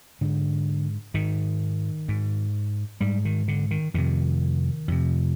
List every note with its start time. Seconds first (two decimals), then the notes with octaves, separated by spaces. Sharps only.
0.21 G#2 D3
1.14 G#2 D#3
2.08 G#2
3.01 G#2 G3
3.25 D#3
3.48 D3
3.71 D#3
3.94 F2 C3 D#3
4.88 F2 C3